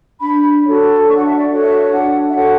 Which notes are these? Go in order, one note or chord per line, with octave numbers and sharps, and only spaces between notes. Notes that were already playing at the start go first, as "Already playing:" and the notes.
D4 B5
F#4 A4 C#5
D4 C#6
F#5
E5
D5
F#4 A4 C#5
E5
D4 F#5
E5
F#4 A4 C#5 F#5